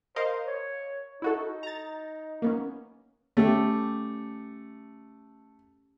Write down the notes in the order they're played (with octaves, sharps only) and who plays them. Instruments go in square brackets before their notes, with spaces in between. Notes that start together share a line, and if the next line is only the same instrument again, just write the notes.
[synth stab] A#4 D#5 F5 [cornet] C5
[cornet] C#5
[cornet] D#4 [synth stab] E4 F#4 A4
[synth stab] A#5 A6
A#3 B3 C#4
[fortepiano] A3 [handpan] C#4 G4 A4